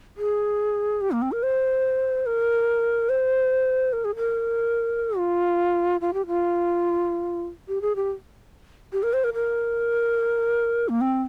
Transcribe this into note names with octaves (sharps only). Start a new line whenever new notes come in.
G#4
G4
A#3
C4
A#4
C5
A#4
C5
A#4
G#4
A#4
F4
F4
G4
F4
G4
G#4
G4
G4
A#4
C5
A#4
A#4
A#3
C4